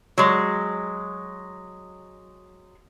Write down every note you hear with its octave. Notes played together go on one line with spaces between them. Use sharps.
F#3 G#3